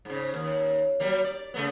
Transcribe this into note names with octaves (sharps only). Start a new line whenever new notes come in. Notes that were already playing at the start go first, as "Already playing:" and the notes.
G#2 C#3
D#2
F#3 G3 A#3
D5
C#3 A3 B3